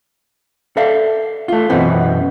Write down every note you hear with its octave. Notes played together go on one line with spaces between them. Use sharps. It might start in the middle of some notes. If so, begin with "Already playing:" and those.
A4 D5 E5 F5
A3 F4
F#2 B2 E3 B3 C4